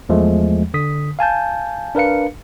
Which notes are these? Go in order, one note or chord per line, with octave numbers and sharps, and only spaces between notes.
E2 F3 G#3 A3
D3 D#6 B6
F5 G#5 A5 G6
D4 A#4 B4 F5 C#7